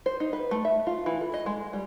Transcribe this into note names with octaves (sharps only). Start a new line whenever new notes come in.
C5
D#4
B4
A3
E5
F4
E3
A4
D#5
G#3
G3